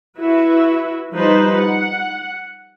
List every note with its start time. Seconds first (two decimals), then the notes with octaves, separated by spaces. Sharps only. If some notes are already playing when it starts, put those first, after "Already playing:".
0.19 E4 F#4 B4 E5
1.15 F3 G3 D#4 B4 C5
1.56 F#5